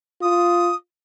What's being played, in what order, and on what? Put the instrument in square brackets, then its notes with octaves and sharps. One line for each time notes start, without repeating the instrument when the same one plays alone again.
[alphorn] F4 [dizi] D#6